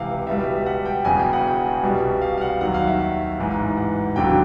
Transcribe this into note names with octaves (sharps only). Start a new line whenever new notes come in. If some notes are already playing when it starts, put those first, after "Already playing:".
Already playing: C#2 C3 E3 F5 F#5
C#2 B2 G3 E5
F#5
G5
E1 E2 C#3 E3 G#5
G5
F#5
G5
C2 B2 G3
F5
F5
F#5
D#2 D#3 F#3 F#5
F5
E5
F5
A1 G#2 E3
F#5
E1 D#2 D3 F#3 G5